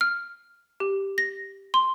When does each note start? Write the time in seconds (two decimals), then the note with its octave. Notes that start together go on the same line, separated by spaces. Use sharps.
0.01 F6
0.80 G4
1.18 A#6
1.74 C6